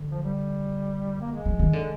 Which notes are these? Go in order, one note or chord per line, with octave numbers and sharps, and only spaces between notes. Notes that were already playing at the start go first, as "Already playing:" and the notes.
Already playing: D3
F3
G3
A#3
G#3
F3
D#3
D3